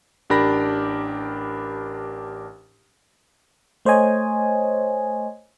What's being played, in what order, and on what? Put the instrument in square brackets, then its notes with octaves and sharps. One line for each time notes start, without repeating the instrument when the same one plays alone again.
[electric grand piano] A1 D4 G4 A#4 B5 A#6
[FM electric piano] A3 C5 C#5 D#5 G#5